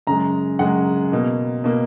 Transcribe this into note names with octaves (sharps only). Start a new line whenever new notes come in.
F#2 C#3 G#3 A#5
F#2 C#3 G#3 F#5
B2 A#3
B2 A#3